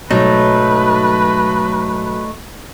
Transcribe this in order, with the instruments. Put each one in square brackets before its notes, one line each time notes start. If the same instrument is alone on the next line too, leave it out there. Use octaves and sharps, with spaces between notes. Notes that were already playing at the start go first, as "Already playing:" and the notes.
[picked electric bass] B1 G#2 [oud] F#3 [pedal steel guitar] A3 D#4 [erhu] B4